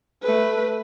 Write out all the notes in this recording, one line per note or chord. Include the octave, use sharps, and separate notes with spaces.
A3 B4